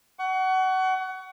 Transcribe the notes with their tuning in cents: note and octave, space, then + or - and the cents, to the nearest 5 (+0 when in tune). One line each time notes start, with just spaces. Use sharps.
F#5 +25 C#6 +25